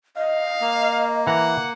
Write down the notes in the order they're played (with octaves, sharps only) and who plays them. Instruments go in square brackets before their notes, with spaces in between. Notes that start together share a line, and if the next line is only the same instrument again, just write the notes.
[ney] D#5 [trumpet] F5
[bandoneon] A#3
[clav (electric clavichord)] E3 A#5 [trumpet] F#5